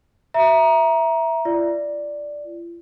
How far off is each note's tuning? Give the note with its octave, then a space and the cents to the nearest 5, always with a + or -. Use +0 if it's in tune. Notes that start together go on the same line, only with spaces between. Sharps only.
E5 +0 A#5 +15
F4 -40 D5 +0